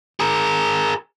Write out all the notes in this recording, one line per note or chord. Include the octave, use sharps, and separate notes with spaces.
G#4 A#4